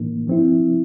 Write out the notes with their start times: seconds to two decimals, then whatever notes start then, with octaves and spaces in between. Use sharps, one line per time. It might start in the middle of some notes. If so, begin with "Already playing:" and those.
Already playing: A2 E3 A#3 D4
0.27 F3 C4 E4